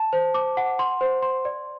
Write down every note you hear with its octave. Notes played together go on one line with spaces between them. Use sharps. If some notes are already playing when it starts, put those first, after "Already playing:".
Already playing: A5
C5
D6
F#5
C6
C5
C6
D5